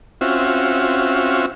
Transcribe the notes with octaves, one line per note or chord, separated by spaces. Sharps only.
C4 C#4 F4 F#4 E5